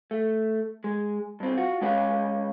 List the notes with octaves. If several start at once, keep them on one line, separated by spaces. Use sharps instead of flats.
A3
G#3
G2 C4
F4 F#4
G#3 C#4 B4 C#5 F5